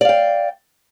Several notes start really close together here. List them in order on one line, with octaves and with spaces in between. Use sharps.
D5 F5 G5